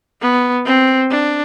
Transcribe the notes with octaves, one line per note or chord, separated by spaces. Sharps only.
B3
C4
D4